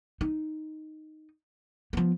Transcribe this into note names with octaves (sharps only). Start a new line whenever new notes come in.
D#4
F3 B3